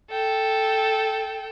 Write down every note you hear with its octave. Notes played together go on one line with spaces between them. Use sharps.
A4 G5